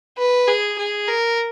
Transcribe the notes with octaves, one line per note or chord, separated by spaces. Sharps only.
B4
G#4
G#4
A#4